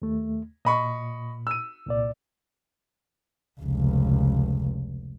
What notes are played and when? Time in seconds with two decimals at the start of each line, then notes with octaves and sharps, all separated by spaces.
0.02 D#2 A3
0.65 A#2 D#5 B5 C#6
1.47 E6 D#7
1.86 C2 A#2 D5
3.61 F1 C#2